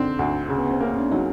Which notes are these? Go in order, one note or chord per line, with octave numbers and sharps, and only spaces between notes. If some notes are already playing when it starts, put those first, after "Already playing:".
Already playing: D3 C4 D4 D#4
D2
C#3
B3
C4
A#3 C#4
D4
F#3 D#4